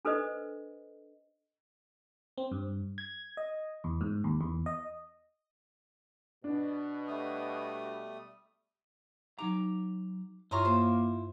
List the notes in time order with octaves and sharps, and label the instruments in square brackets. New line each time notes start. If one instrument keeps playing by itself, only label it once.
[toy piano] D4 A4 B4 C5 D#5
[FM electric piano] C4
G2
G#6
D#5
E2
G#2
D#2
E2
D#5
[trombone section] B2 [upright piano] D4
[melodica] G3 A3 D#6
[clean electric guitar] F#3 D#4 A#5 [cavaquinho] D6
[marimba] G2 C#5 C#6 [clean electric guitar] E4 F4 [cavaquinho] A#5 C6 D#6
[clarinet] A#3 [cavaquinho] C5